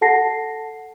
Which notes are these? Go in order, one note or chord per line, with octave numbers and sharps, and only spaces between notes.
A4 F#5 A5 A#6 C7